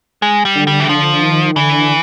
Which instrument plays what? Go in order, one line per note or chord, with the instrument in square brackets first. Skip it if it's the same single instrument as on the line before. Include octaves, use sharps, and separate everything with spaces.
[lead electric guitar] G#3
G3
[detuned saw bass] D3
[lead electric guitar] G3
E3
[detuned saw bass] D3 [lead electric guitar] F3
[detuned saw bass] D#3
[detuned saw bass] D3 [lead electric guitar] E3